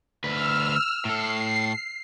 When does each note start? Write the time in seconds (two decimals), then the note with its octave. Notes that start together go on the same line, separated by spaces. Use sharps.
0.24 D2 B4 E6 F6
1.05 A2 A4 C7